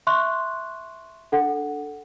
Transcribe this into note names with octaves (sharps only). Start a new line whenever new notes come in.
E5 C6 C#6 F#6
D4 A4 F#5